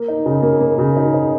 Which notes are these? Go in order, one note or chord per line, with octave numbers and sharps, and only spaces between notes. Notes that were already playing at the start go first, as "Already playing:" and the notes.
Already playing: A#3
D#4
C#3
A#3
A#3
C#3
D#4
D#4